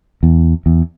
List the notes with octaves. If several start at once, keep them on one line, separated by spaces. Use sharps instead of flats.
E2
E2